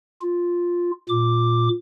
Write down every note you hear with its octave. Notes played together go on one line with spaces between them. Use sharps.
F4
A#2 D6